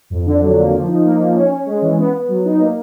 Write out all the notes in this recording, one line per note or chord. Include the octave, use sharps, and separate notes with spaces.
F2
D3
F#3
A#3
F3
D#4
A#3
F3
C#4
C#4
G#3
E3
B3
B3
F#3
D#4
A#3